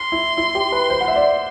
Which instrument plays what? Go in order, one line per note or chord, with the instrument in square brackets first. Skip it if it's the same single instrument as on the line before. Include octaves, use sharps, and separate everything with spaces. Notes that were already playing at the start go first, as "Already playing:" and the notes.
Already playing: [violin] C6
[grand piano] E4
E4
G4
B4
C5
F#5
E5
D5